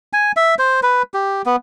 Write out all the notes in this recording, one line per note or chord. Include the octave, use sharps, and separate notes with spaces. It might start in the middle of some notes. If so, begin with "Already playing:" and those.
G#5
E5
C5
B4
G4
B3